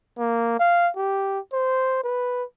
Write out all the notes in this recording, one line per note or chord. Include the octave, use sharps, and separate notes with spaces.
A#3
F5
G4
C5
B4